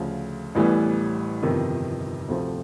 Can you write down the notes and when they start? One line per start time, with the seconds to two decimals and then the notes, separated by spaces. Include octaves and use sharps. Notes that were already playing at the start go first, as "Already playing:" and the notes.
Already playing: D2 C#3 F3
0.55 A1 A2 E3 G3 B3
1.43 G1 F2 C3 D#3
2.29 D2 C3 F3 A3 C4